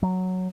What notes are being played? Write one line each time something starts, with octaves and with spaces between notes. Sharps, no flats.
F#3